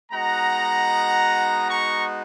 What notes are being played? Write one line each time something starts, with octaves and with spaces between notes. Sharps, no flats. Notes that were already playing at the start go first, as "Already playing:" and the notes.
G#3 B3 D#4 F#4 F#5 A#5
A#5 C#6